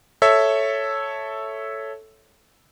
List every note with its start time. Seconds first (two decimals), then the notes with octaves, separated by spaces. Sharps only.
0.22 A4 C#5 E5